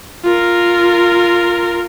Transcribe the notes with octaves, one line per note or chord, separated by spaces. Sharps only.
F4 A#4